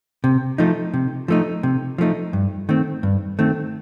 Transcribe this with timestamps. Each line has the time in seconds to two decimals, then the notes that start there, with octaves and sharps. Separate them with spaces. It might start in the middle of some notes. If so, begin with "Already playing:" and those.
0.24 C3
0.58 F3 A3 D#4
0.94 C3
1.28 F3 A3 D#4
1.63 C3
1.98 F3 A3 D#4
2.33 G2
2.69 D#3 A3 C4
3.03 G2
3.39 D#3 A3 C4